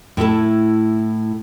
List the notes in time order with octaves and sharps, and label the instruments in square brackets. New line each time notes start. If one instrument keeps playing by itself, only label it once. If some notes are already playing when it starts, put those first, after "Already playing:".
[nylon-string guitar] A2 E4 A4 A5